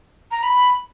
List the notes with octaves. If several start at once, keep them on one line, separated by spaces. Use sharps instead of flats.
A#5
B5